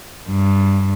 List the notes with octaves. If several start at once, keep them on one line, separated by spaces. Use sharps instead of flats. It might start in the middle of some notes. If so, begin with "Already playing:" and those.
G2